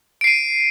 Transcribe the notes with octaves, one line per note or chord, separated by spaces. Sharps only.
C7 D7 D#7